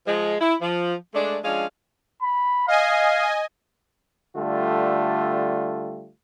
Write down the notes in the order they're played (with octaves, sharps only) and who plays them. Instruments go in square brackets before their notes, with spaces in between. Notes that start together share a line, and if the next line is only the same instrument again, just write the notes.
[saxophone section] F3 G#3
E4
F3
G#3 A3 D4
F3 G#3 C#4 D4 F5
[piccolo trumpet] B5
[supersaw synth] D#5 G#5 [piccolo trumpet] F5
[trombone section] D3 G3 A3 F4